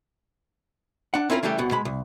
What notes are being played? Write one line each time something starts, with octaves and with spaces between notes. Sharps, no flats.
D4 F#5
C4 C#4 E4 F4 A4 A#4
C#3 E3 G3 A3 G4
C2 B2 F#5
B2 G#3 B5
C2